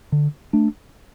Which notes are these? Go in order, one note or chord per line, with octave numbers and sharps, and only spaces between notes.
D3
A3 D4